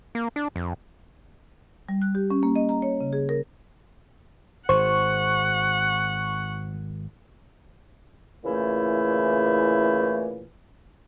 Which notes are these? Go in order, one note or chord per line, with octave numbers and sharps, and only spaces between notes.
A#3
D4
F2
G3
F#6
G4
C#4
A#3
D#5
A#5
C#5
C#3
G#4
A#4
G#1 C5 F#5 C#6
A#2 C#3 E3 A3 E4